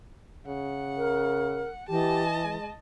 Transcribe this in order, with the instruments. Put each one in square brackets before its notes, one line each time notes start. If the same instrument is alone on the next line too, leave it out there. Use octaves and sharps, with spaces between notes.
[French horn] C#3 [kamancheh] F#5
[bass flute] A#4
[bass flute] E3 [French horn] G4 [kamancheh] D#5 A5
[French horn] G#3